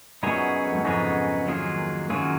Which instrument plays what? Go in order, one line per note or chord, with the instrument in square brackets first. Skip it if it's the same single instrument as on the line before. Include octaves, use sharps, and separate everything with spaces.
[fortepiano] F#2 A#2 [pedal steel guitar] B3 D#4 G#4 C#5
[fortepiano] F2
F#2
[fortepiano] F2 G#2 [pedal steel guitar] B3 D#4 G#4 C#5
[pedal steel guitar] D#3 F#3 A#3 F4 G#4
[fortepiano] F#2 [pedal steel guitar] D#3 F#3 A#3 F4 G#4